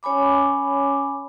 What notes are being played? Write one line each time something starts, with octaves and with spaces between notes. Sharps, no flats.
C#4 C#5 G#5 B5 D6